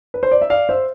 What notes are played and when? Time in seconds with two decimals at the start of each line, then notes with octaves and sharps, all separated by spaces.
0.14 B4
0.23 C5
0.31 D5
0.42 E5
0.50 D5 F5
0.69 C5 E5